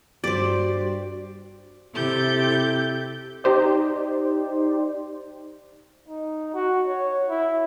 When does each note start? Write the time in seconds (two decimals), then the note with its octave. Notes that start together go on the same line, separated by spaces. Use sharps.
0.24 G2 F#4 G4 C5 D5
1.94 C3 E4 G4 A4 G6 A6
3.44 D#4 G4 C5 D5
6.08 D#4
6.54 F#4
6.87 C#5
7.29 E4